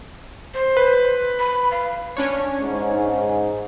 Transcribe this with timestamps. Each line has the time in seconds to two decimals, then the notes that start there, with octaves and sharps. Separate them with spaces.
0.54 C5
0.77 B4
1.39 B5
1.71 F5
2.17 C#4 D4 C#5
2.60 G#2